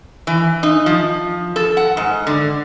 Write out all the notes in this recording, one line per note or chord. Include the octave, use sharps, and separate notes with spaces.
E3
D#4
F3
A4
F#5
G#2
D3